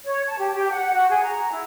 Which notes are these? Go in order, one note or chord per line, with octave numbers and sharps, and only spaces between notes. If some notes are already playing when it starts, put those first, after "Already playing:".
C#5
A5
G4
G4
F#5
F#4
G#4
A#5
E4